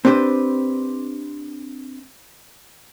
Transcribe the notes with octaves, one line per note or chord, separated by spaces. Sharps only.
C4 D4 G4 B4 C5